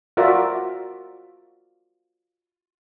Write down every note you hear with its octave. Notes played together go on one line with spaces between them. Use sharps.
F4 F#4 A#4 D5 E5